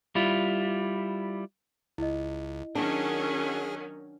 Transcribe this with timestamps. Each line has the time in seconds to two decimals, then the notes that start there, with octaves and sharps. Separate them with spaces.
0.15 G3 E4 F4
1.98 C#2 E4 D#5
2.75 D#3 F#3 C#4 D4 G#4